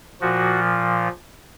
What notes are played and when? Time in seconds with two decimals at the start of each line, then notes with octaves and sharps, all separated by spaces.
0.21 A#2 F3 F#4